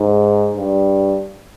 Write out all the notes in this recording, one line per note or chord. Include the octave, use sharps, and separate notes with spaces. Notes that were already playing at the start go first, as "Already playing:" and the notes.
Already playing: G#2
G2